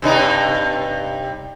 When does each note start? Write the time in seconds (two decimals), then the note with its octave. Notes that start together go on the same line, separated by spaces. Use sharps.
0.02 G2 C3 D#4